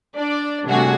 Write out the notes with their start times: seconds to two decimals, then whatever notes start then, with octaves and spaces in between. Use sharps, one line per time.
0.16 D4 D5
0.66 C3 G3 A3 D4 F#4 G#4